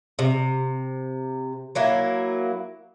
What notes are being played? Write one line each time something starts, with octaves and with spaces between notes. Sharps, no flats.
C3
F#3 A#3 E4